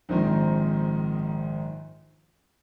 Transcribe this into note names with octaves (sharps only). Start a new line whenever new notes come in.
A#1 G#2 D#3 C4 D#4